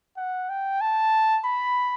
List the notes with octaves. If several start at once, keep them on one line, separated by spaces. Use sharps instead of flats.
F#5
G5
A5
B5